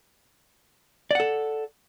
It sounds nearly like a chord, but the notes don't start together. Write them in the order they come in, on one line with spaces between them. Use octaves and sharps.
D5 F#5 A4